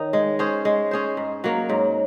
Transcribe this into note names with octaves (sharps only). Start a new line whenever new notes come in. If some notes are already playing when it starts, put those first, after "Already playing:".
Already playing: D#3 D#4 C#5
G#3
C#4 G#4 C5
G#3 D#5
C#4 G#4 C5
G#2
F#3 A#3
G#2 C#5